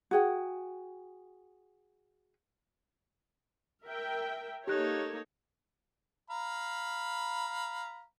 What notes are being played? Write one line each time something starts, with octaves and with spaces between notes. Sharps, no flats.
F#4 G#4 G5
A#4 E5 G5
A#3 D#4 G4 A4 C#5 F#6
F5 A#5 B5